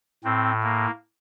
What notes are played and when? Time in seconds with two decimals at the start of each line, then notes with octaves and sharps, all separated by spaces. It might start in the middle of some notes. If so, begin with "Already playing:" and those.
0.24 A2 C4
0.63 A#3